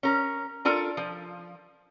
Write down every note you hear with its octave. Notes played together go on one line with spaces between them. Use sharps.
C#4 A#4
D4 F4 A4 A#4
F3